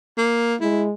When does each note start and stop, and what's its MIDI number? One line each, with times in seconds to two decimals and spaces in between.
0.18 0.55 58
0.61 0.93 56
0.61 0.85 64